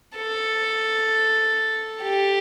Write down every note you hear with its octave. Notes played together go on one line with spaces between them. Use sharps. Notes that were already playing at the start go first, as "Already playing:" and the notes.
A4
G4